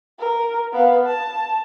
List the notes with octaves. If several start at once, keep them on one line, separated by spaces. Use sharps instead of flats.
A#4
B3 F5
A5